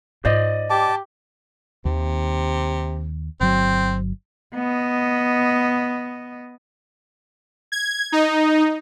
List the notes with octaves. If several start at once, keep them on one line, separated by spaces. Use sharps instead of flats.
G#2 F4 C5 D5 D#5
G4 A5 D6
D#2 C3 D#3
G1 F#3 C4
B3 D#5
G#6
D#4